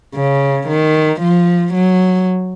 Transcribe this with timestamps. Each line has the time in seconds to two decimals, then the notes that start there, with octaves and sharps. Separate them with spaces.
0.15 C#3
0.68 D#3
1.21 F3
1.74 F#3